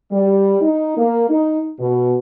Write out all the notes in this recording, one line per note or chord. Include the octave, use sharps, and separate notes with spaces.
G3
D#4
A#3
D#4
B2